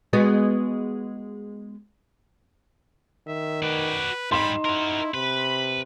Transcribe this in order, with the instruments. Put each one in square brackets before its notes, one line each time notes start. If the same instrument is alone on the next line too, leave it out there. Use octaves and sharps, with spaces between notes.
[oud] G#3 B3 F#4
[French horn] D#3 [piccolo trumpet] E5
[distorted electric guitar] F#4 D5 [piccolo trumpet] B4
[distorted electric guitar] G#2 G3 [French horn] D#4 [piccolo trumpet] B5 [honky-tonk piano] C6 E7
[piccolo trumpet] E4 [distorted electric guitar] F#4 A#4
[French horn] C3 [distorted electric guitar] B4 [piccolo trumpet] B5